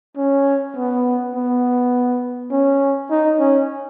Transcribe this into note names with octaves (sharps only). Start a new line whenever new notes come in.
C#4
B3
B3
C#4
D#4
C#4